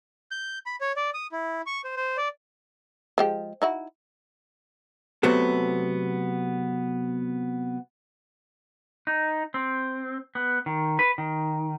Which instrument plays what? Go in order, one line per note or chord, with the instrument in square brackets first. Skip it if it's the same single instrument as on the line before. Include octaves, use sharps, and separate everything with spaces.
[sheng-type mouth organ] G6
B5
C#5
D5
D#6
E4
C#6
C5
C5
D5
[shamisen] F3 G#3 G4
D#4 E4 F#4
[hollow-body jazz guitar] C3 F#3 A3 B3 A4
[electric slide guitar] D#4
C4
B3
D#3
B4
D#3